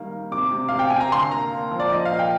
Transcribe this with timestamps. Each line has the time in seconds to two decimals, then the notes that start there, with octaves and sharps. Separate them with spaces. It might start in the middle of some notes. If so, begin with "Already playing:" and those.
Already playing: D#3 G3 A#3
0.12 A#3
0.31 C3 D6
0.51 C3
0.69 C3 F5
0.79 G5
0.90 C3 G#5
1.00 A#5
1.12 D3 C6
1.31 A#3 A#5
1.52 A#3
1.71 F3
1.80 D5
1.91 F3 D#5
2.05 F5
2.12 A#2
2.19 G5